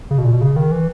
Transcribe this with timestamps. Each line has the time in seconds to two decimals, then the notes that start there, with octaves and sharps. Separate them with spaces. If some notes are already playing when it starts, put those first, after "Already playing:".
0.11 C#3
0.18 B2
0.24 A#2
0.33 B2
0.41 C#3
0.56 D#3
0.72 E3